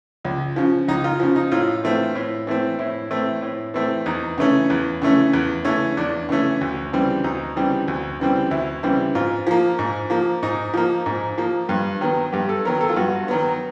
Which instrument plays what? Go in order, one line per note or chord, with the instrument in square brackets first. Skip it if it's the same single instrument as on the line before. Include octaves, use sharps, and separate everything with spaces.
[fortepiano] C#2
C#3 F3
C#2 D#4
F4
C#3 F3
D#4
A2 F4
E3 A3 C4
A2
E3 A3 C4
A2 E4
E3 A3 C4
A2
E3 A3 C4
E2 D#4
C#3 E3 A3 C#4
E2
C#3 E3 A3 C#4
E2
C#3 E3 A3 C#4
E2 D4
C#3 E3 A3 C#4
D2
C#3 E3 G3 C4
D2 D#4
C#3 E3 G3 C4
D2
C#3 E3 G3 C4
D2 E4
C#3 E3 G3 C4
G#2 F4
F3 A#3
G#2
F3 A#3
G#2 D#4
F3 A#3
G#2
F3 A#3
G2
D#3 F#3 B3
G2 G4
A4
D#3 F#3 B3 A#4
A4
F4
G2 F#4
D#3 F#3 B3